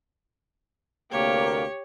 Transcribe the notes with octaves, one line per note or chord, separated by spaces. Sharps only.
D2 C3 A#3 G4 C#5